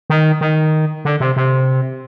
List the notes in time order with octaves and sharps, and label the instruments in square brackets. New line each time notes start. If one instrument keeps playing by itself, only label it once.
[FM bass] D#3
D#3
D3
C3
C3